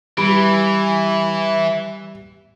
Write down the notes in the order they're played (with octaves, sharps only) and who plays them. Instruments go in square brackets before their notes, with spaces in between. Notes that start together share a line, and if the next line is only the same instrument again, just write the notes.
[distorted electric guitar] E3 [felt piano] G3 [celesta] B5 D7